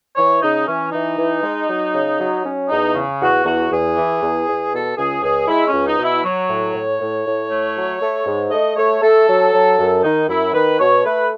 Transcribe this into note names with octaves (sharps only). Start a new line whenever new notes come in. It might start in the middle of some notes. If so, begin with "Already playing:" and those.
E3 C#5
C#3 D#4
E3 C#4
E3 D#4
E3
G#3
F#3
C#3
F#3
F#3 C#4
E2 D#4
C#3
E2 F#4
E2 F#4
E2 G#4
E3
E2
E2
B2 A4
C#2 G#4
C#2 G#4
G#3 E4
C#4
C#2
D#4
B2
E4
F#3 C#5
A2
A2
A2
A2
A3
F#3
A3
G#2
A3 D#5
A3 C#5
A3 A4
F#3
F#3
F#2
D#3 D#4
F#2 E4
D#3 B4
B2 C#5
A3 B4